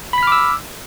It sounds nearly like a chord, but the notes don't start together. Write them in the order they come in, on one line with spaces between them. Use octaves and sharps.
B5 B6 F6 D6 E6